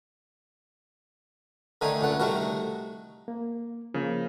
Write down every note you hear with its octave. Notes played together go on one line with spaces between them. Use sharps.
D3 D#3 A3 D#4 G#5
C#2 D3 A3 F#5
C2 D#3 A3 F#4 A#4
A#3
C#3 F3 A#3